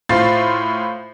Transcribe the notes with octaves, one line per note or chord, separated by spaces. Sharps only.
A2 F4 C5 A6 C7